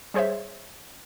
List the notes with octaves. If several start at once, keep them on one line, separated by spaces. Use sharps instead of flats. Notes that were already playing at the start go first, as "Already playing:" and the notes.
G3 G#4 C5 C#5 E5